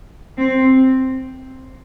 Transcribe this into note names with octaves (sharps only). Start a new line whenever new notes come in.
C4